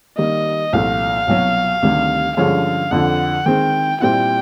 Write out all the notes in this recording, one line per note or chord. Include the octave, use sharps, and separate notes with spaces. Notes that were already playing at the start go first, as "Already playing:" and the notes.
D#3 G3 A#3 D#5
C2 A#2 F3 A3 F5
C2 B2 F#3
D2 C3 D#3 G3
G2 D3 F3 G#3 C#4 F5
F2 D3 F3 F#5
D#3 G#3 C4 G5
A#2 G3 C4 E4 G5